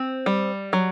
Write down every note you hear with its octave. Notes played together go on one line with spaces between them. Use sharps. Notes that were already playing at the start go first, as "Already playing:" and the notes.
Already playing: C4
G3
F#3